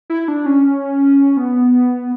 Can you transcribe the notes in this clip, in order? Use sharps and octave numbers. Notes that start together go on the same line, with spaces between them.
E4
D4
C#4
B3